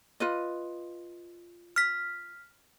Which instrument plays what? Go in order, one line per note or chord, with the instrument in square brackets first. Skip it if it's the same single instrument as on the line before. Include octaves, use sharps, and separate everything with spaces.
[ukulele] F4 B4 D#5
[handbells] F6 B6